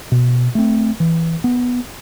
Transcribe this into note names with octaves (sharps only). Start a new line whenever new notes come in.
B2
A3 C4
E3
B3